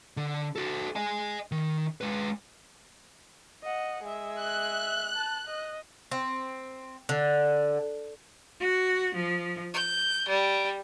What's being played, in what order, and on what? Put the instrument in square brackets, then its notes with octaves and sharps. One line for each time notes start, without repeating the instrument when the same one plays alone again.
[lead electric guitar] D3
F#4 A4
D#5 G#5
D#3
G#3 B4
[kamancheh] D#5 F#5
G#3 E5
[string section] F#6
[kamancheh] A5
D#5
[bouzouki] C4
D3
[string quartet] F#4
F3
G6
G3